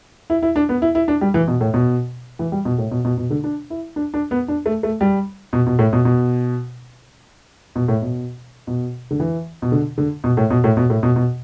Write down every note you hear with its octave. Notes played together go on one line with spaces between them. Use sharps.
E4
E4
D4
B3
E4
E4
D4
G3
E3
B2
A2
B2
E3
G3
B2
A2
B2
B2
B2
D3
D4
E4
D4
D4
B3
D4
A3
A3
G3
B2
B2
A2
B2
B2
B2
A2
B2
B2
D3
E3
B2
D3
D3
B2
A2
B2
A2
B2
A2
B2
B2